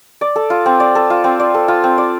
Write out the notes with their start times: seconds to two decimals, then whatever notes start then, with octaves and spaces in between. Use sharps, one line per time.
0.21 D5
0.36 A4
0.50 F4
0.66 C4
0.80 D5
0.95 A4
1.10 F4
1.24 C4
1.40 D5
1.54 A4
1.68 F4
1.84 C4
1.98 D5